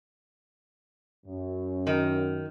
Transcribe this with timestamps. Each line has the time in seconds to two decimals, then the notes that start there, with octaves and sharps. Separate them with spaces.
1.25 F#2
1.87 D#3